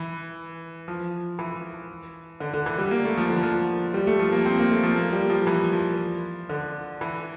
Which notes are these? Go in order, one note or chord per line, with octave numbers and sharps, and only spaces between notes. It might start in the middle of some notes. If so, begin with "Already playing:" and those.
Already playing: E3
F3
E3
D3
D3
E3
G3
A#3
A3
F3
D3
F3
G3
A3
F3
A#3
C4
A#3
A3
F3
A#3
G3
F3
E3
F3
D3
E3